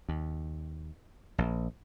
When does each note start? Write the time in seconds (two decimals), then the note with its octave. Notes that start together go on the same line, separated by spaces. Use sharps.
0.09 D#2
1.38 A#1